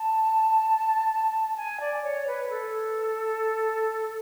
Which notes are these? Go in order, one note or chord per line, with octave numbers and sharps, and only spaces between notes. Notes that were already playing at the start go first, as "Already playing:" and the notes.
Already playing: A5
G#5
D5
C#5
B4
A4